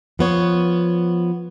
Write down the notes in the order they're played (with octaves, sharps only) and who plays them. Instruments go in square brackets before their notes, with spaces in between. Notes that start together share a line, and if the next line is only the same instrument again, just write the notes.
[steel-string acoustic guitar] F3 B3 C#5